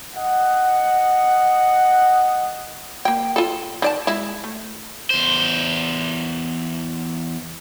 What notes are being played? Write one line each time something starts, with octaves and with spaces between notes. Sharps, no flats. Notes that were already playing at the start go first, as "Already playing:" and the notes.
D#5 F#5
A#3 G5
F4 A4
D#3 D5 A5
G#3 E4
A3
E2 C5